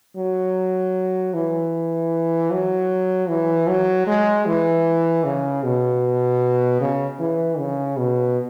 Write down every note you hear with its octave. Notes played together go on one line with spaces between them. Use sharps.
F#3
E3
F#3
E3
F#3
G#3
E3
C#3
B2
C#3
E3
C#3
B2